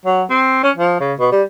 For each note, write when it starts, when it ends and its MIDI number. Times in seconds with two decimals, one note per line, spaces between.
0.06 0.23 54
0.30 0.63 60
0.63 0.71 61
0.76 0.99 53
1.01 1.14 49
1.20 1.30 47
1.32 1.43 55